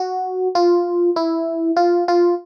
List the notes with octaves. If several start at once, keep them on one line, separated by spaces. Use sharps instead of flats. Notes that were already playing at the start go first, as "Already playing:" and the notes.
Already playing: F#4
F4
E4
F4
F4